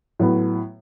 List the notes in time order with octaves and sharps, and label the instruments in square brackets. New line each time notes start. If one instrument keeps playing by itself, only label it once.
[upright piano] A2 F#3 B3